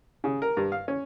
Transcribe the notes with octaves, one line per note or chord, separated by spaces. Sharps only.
C#3
A#4
G2
F5
C#4